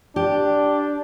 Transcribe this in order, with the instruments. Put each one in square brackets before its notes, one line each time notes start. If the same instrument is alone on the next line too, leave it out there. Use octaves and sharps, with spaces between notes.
[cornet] D4 [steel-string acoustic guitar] G4